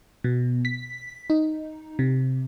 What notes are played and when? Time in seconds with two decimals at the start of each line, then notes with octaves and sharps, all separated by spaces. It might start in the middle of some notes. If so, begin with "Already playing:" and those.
0.24 B2
0.65 B6
1.30 D#4
1.99 C3